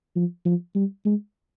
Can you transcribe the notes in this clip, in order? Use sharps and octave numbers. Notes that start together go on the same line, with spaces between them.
F3
F3
G3
G#3